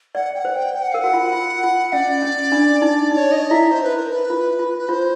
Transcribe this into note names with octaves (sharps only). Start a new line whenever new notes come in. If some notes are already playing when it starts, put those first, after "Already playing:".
D5 F#5
G5
F#5
C5
G5
G5
F#5
A#4 F5
F#4 F#5
F4
F4
F4
C#4 D5
C#4
D4
D#4
D#4 D5
C#5
D#5
E4 E5
C5
B4
A#4
B4
F4
F4
B4
F4 C5